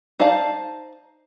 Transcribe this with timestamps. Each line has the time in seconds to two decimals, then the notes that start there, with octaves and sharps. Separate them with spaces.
0.19 D#4 C5 D5 F5 A5